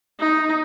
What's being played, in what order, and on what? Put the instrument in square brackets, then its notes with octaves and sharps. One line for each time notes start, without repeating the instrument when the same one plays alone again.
[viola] D#4